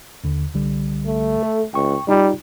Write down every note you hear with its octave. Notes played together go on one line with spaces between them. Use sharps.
D#2 D3
C2 D3 G3
A3
A4
C#2 G5 C#6
G3 D#4 F4